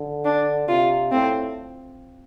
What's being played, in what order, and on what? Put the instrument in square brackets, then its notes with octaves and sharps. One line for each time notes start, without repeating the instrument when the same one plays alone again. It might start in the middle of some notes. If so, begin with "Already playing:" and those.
Already playing: [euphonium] D3
[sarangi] D4
[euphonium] C3 [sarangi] F4
[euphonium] A2 [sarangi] C4